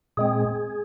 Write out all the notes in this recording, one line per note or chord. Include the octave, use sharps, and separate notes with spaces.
A#2 G#3 C4 G#4